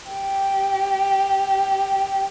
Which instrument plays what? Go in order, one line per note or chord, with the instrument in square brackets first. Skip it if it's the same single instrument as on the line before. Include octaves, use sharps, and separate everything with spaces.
[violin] G4